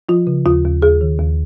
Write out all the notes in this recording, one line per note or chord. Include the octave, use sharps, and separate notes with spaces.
F3 F4
C#3
D#2 F4
D#2
D#2 G#4
D#3
D#2